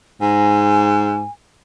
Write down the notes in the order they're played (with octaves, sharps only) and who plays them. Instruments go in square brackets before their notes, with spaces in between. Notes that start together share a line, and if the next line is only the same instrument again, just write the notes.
[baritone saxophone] G#2 [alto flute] G#5